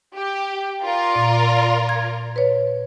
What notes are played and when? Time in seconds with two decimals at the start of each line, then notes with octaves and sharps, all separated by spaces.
0.15 G4
0.84 F4 A#4 D5
1.16 A#2
1.89 G#6
2.36 B4 C#5